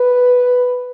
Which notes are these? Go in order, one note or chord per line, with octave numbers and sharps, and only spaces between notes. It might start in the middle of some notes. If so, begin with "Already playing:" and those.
Already playing: B4